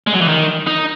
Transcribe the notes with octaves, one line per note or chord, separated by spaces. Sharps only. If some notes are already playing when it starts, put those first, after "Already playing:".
G#3
F#3
E3
D#3
D#4